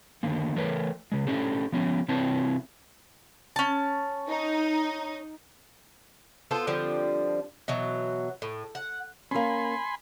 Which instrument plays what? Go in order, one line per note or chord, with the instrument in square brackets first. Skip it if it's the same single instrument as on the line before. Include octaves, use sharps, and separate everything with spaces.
[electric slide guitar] D3 D#3 A#3
E3 A3 A#4 B4 C#5
C#3 G#3
A3 C#4 D4 G4 A4 C5
F3 B3 C#4 F4 G4
C3 E3 C4 B4 C#5 A5
[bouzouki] C#4 A5
[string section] D#4
[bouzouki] B3 F4 A4 C5
D3 F3 G3 C4
B2 E3 F#3
A2
F#5
[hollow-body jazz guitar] A#3 C#4 [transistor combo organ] G#5 B5 C6